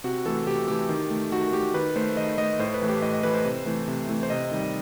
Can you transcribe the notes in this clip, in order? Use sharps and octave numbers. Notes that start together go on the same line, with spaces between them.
C3 F#4
E3 A3 A4
C3 G4
E3 A3 G4
D#3
A3
D#3 F#4
A3 G4
D#3 B4
A3 C5
D#3 D#5
A3 D#5
A2 C5
B4
E3 A3
G4
A2 D#5
D#5
E3 A3 B4
C5
C3
E3 A3
C3
E3 A3
C5
C3 D#5
D#3 G3